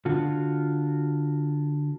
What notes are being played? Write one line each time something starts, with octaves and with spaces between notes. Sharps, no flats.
D3 F4 F#4